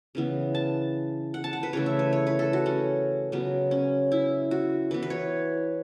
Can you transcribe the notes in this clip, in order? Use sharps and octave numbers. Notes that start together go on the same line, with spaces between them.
C#3 E3 B3
A5
F#5
A5
F#5
B4
C#3 E3 A3 C#5
E5
B4
C#5
B4
A4
F#4
C#4
C#3 F#3 B3
C#4
E4
F#4
E3 B3 B4
B4
C#5